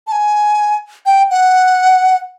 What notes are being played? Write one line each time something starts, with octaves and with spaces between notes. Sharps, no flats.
A5
G#5
G5
F#5